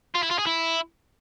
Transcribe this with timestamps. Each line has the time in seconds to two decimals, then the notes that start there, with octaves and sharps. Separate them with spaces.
0.15 F4
0.23 E4
0.31 F4
0.39 G#4
0.47 E4